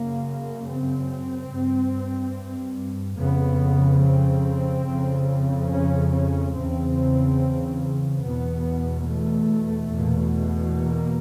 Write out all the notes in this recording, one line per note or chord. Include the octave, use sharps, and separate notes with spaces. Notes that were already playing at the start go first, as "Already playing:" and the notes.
Already playing: F#2 C#3 A#3
C4
G2
F2 C#3 B3
C4
F2 C#3
C#4
C#4
E2 C#3 C4
E2 B2 B3
A3
E2 B2
A#3